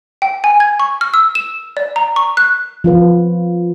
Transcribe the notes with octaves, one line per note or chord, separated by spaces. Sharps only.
G5
G#5
G#6
C#6
F6
E6
E7
D5
A#5
C#6
F#6
F3 F4 B4